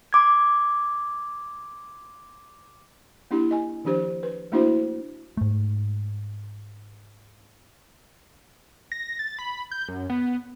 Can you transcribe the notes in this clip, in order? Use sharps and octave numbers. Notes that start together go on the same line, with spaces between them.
C6 D6 G#6
A#3 D4 E4 G4
D#5 G#5
D#3 F3 D4 G4 C5
B4
A3 A#3 D4 E4 F#4 C5
G#2 A3
A#6
A6
B5
G6
F#2
B3